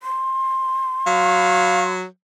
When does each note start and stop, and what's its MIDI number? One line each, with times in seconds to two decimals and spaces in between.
0.03 1.92 84
1.07 2.05 54
1.07 1.83 77